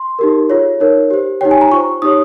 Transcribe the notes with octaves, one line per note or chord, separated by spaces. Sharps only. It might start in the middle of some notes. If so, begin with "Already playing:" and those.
Already playing: C6
D#4 G4 A#4
F4 G#4 C#5
D#4 A#4 C#5
G4 C5
D#4 G4 C#5 G5
G#5
A#5
F4 C5 C#6
D#4 G4 C#5 D#6